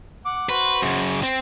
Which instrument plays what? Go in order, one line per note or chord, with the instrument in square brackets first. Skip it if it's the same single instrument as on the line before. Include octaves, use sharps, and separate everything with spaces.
[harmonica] F#5 D6
[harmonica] F#4 C5 [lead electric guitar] B4
[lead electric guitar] F#2 C#3
C4